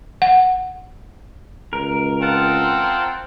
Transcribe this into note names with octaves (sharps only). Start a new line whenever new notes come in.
F#5
C#2 A#4
C4 F4 F#5 A5